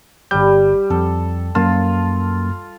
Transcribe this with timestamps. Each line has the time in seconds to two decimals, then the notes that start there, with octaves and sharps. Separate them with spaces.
0.31 G1 G3 G6
0.90 F2 A4
1.55 F#2 A#3 F4 A5